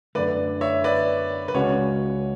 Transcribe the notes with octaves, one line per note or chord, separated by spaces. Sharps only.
F#2 D3 A3 B4 D5
C#5 E5
B4 D5
B4
C#2 C#3 G#3 C#4 F#4 C#5